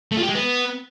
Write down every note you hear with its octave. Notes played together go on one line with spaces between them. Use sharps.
A3
F4
G4
G#3
B3